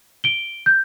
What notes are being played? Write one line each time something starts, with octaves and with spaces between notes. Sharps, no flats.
D7 G7
G6